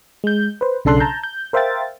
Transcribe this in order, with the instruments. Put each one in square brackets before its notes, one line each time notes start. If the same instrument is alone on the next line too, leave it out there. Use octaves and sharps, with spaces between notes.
[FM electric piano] G#3 G6
B4 C5
B1 C#3 D4 A4 C6 F#6
A5 A#5 G6
G6
A#4 C5 E5 F5 G5 A6